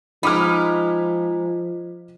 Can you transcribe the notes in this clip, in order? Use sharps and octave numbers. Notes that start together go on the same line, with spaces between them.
F3 G#3 D#4 B5 D6 F6